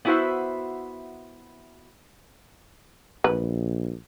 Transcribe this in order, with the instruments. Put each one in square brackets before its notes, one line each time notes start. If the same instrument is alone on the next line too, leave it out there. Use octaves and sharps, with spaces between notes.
[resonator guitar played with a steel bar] B3 D4 E4 F#4 C5 E5
[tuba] A#1 [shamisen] B4